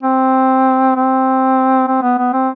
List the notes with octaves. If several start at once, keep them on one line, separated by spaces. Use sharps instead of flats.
C4
C4
C4
B3
B3
C4